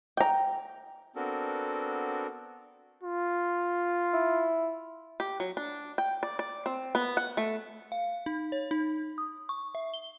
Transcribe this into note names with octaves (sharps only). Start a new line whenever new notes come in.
G5 A#5
B3 C4 D4 F#4 A4 A#4
F4
E4
G4
F#3
D4
G5
D5
D5
C4
B3
F#5
A3
F5
D#4
C#5
D#4
D#6
C#6
E5
G7